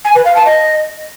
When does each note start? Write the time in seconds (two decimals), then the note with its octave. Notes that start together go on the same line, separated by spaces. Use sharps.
0.05 G#5
0.15 B4
0.25 F5
0.35 A5
0.46 D#5